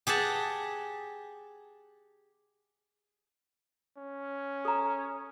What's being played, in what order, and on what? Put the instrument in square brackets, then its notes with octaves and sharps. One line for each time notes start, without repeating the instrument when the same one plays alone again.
[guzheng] G4 G#4 F#5 A5
[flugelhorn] C#4
[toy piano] A4 A#5